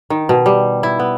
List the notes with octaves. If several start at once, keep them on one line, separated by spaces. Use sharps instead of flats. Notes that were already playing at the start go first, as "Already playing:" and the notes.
D#3
B2
G3
E4
B3